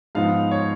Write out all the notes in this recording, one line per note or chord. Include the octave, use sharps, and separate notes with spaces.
G#2 F3 B3 D#4 F5
C#5